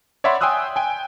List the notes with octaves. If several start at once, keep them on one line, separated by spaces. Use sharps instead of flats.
C#5 D5 E5 F#5 B5 C6
G5 G#5 C6 D#6 E6 F#6
G5 G#5